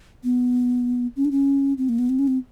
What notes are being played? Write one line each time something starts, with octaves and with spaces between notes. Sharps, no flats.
B3
C#4
D4
C#4
C4
A#3
B3
C4
C#4
C4